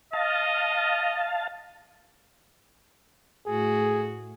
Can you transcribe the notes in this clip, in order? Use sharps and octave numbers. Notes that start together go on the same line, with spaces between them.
D#5 F5 A5
A2 A3 F#4 G#4